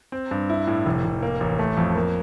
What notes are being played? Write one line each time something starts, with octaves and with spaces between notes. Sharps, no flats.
C4
G2
E4
A2
F1
F1
A#3
A1
A3
F2
A#3